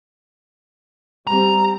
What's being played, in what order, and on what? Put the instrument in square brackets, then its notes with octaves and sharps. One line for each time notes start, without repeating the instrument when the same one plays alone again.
[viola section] G3 C4 [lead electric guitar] A#5